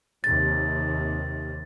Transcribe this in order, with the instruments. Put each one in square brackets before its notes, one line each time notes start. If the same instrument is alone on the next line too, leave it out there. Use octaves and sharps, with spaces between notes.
[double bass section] D#2 C3 [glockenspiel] A6